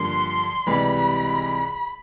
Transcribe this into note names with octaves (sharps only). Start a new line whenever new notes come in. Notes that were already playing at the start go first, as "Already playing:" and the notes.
Already playing: G2 D3 F3 A#3 C6
C#2 C3 E3 G3 B5